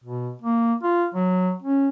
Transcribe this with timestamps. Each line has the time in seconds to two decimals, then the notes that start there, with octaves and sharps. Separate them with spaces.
0.04 B2
0.42 A#3
0.83 F4
1.14 F#3
1.63 C#4